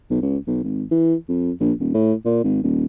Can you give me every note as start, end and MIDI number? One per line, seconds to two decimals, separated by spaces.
0.10 0.18 35
0.22 0.37 37
0.47 0.61 35
0.64 0.83 32
0.91 1.15 52
1.28 1.51 41
1.60 1.73 34
1.80 1.92 27
1.94 2.13 45
2.25 2.42 46
2.44 2.60 32
2.63 2.85 27